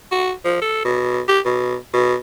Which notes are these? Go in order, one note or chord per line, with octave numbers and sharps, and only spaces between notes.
F#4
F3
A4
B2
G4
B2
B2